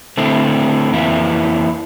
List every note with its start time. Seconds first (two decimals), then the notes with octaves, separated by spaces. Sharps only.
0.17 D3 A3 C4 E4
0.93 F2 E3 A#3 E4